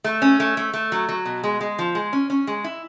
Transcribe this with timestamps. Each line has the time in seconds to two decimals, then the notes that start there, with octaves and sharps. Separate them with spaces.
0.04 A3
0.22 C#4
0.40 A3
0.57 A3
0.73 A3
0.92 F#3
1.09 F#3
1.25 B2
1.44 G#3
1.61 G#3
1.79 F3
1.95 G#3
2.13 C#4
2.30 C#4
2.47 G#3
2.64 E4